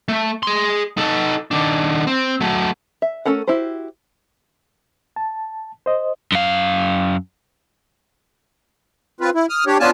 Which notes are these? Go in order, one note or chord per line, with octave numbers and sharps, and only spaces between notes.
A3
G#4 C6
D#4 A4
D#3 D4
C4
F#3 A3
E5
A3 C#4 A4 A#4 F#5
E4 F#4 G4 C5
A5
C5 D#5
F#2 F5
C4 F4 B4
E4
D#6 F6
D4 G4 C#5
B3 C#4 D4 F4 G#5 A5